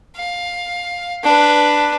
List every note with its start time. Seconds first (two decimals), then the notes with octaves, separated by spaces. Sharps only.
0.16 F5
1.24 D4 B4